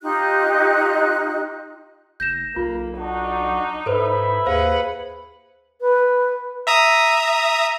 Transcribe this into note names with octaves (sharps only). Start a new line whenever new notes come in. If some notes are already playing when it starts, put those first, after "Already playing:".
D#4 F4 G4 F#6
F1 G6 A#6 E7
B1 A#3 F4
D4 D#4 F#4
G#2 E4 A4 B4 C5 E5 B5
D#2 G#4 B4 C5 F5 F#5
B4
E5 A#5 D#6